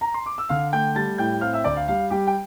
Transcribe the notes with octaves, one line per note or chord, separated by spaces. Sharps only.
A#5
C6
D6
E6
D3 F5 F6
A3 G5 G6
G3 A5 A6
A2 G5 G6
C4 F5 F6
E5 E6
D2 D5 D6
F5
G3 F5
G3 G4 G5
G5